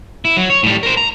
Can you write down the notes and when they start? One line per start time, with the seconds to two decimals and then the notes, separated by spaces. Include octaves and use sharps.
0.25 E4
0.37 F#3
0.50 C#5
0.63 A2 G3
0.83 A#4 C5
0.97 A#5